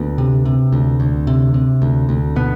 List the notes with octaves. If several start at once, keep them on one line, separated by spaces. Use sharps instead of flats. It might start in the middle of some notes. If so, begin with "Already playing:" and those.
Already playing: D2 B3
C3
C3
D2
D2
C3
C3
D2
D2
B2 B3